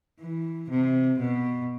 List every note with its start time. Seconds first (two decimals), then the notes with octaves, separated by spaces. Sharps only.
0.20 E3
0.69 C3
1.18 B2